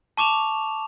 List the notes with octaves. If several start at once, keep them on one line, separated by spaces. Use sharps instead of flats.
A5 C#6 D6 E7 F7